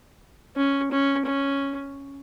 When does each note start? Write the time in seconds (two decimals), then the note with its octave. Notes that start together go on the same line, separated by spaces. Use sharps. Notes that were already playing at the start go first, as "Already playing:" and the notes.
0.57 C#4
0.91 C#4
1.26 C#4